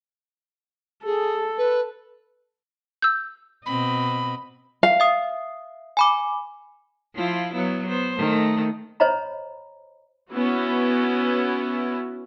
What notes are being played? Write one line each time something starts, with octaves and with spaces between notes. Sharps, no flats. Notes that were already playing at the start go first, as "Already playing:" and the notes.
G#4 A4
B4
E6 G6
B2 C4 D#5 B5
F5
E5 D#6 C7
G#5 B5 D6
F3 E4 F4
F#3 B3 E4
B3 C5
D#3 A3
C5 C#5 D#5 A#5 B5
B3 C#4 E4 F#4